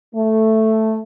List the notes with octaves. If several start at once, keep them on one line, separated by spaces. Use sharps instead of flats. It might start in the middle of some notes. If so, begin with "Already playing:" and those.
A3